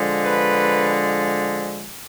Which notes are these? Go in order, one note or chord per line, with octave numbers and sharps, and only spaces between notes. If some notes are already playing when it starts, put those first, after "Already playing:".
Already playing: D3 F3 G#3
B4